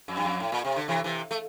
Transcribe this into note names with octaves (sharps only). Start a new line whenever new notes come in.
F2
G2
F2
A2
A#2
C3
D3
C3 E3
C3 E3
A3